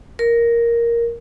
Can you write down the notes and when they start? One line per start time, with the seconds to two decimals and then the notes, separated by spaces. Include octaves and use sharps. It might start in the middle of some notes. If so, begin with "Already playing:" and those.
0.19 A#4